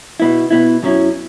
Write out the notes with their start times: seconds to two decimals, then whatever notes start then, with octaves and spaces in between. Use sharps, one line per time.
0.20 B2 B3 E4
0.51 B2 B3 E4
0.83 F#2 F#3 C#4 E4